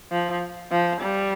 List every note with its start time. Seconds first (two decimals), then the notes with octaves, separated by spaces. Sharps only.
0.12 F3
0.71 F3
1.01 G3